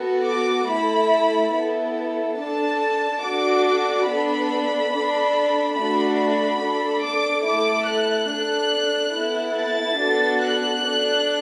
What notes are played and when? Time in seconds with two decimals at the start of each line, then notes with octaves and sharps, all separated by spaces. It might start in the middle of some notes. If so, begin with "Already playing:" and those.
Already playing: B3 F#4 A4
0.26 D6
0.69 A3 E4 A4 B5
1.53 B3 E4 A4
2.38 D4 A4 A5
3.22 D4 F#4 A4 D6
4.07 B3 D4 A4 B5
4.92 D4 A4
5.76 A3 D4 F#4 A4 B5
6.19 B5
6.61 D4
6.66 A4
7.03 D6
7.46 A3 E4 A4 D6
7.88 F#6
8.30 D4 A4
9.15 B3 E4 A4
9.57 A6
9.99 B3 D4 F#4 A4
10.41 F#6
10.84 D4 A4